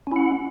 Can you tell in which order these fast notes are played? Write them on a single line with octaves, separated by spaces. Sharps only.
C#4 E4 F#5